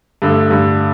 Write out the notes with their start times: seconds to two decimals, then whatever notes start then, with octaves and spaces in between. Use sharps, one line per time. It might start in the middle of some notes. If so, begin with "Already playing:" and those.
0.22 G2 D3 A3
0.51 G2 D3 A3